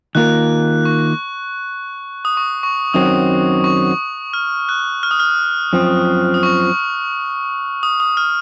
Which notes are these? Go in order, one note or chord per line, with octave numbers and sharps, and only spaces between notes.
D#3 A#3 F4 A#4 F#6
C#6
D#6
C#6
C#6
F#2 D#3 F#3 C4 D#6
C#6
F6
F#6
F6
D#6
F6
F#2 F3 C4
D#6
C#6
D#6
D#6
F6